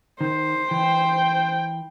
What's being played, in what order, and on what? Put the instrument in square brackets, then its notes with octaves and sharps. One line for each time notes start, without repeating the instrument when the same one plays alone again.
[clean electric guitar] D#3 [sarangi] C5
[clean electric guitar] E3 [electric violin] G5